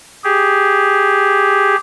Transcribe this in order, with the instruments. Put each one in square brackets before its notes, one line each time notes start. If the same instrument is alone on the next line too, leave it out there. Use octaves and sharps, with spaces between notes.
[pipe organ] G4 G#4